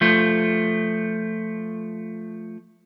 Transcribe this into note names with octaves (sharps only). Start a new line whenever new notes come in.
F3 A3